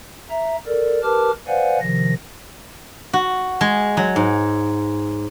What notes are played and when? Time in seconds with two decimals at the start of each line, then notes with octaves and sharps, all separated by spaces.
0.30 E5 A#5
0.67 A4 A#4 D5
1.03 G4 A#4 B4 A5 D6 F6
1.47 B4 C5 D5 F5 F#5 G#5
1.80 C3 D#3 F3 A#6
3.13 F#4
3.61 G#3
3.97 F#3
4.16 G#2